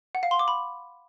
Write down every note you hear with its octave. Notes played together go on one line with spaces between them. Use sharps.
F#5
F5
C6
D6
B5